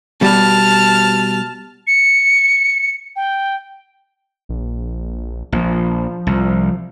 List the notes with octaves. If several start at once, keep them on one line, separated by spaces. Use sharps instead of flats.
B2 G3 A5 F6
C#7
G5
A#1
A#1 F3
C2